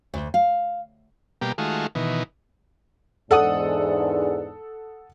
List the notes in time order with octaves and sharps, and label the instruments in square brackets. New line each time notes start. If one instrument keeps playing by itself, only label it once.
[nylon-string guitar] D2
F5
[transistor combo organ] B2 G3 A#3 G4
D#3 G#3 A3 F4 F#4
B2 D#3 E3
[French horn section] E2 G#2 [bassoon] D4 [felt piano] A4 F#5 D#6